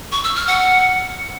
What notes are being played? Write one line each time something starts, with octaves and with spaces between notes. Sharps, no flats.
C#6
E6
F6
F#5